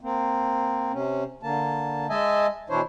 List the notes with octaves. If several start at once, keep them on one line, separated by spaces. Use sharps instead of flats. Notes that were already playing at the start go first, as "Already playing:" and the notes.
A#3 C4
C3 C#4
D3 A#3 A5
G#3 D#5 E5 G#5 A5
B2 E3 D4 E4 C5 C#5